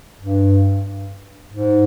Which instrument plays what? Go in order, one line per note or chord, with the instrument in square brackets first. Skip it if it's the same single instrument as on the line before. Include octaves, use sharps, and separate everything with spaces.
[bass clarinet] G2
G#2